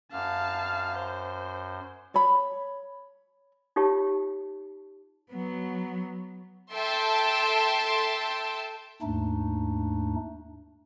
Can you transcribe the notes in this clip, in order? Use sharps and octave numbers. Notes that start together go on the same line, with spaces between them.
F#2 F5 A5
C5
C#5 B5
D#4 F4 G4 C#5 A5
F#3 B3
A4 E5 G5 A5 C6
D#2 G#2 A3 D4 D#4